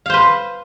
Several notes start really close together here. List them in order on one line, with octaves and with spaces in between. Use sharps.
F5 C5 B4